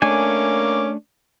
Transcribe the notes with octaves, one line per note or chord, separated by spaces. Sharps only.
A3 A#3 C#4 D4 G#5 D6